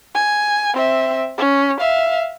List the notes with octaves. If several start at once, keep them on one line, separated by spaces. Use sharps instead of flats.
G#5
C4 E5
C#4
E5 F5